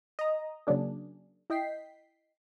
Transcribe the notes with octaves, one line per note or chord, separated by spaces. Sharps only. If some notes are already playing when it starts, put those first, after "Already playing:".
D#5 A#5
C#3 F#3 A#3 D4 G#4
E4 D#5 G5 B6 C7